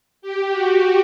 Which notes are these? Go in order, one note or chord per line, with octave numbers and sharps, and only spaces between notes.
G4
F#4